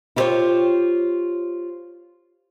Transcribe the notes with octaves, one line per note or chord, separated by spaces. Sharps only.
E4 F4 G4 A#4 C5 C#5